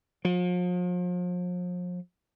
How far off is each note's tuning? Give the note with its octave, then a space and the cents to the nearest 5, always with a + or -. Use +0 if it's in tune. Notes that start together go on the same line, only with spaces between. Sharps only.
F3 +40